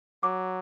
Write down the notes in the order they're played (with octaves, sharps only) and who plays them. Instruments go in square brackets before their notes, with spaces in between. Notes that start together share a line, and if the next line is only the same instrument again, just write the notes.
[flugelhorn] F#3 [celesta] D6